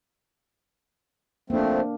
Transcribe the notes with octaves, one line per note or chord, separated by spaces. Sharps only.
F3 A3 A#3 C4 D4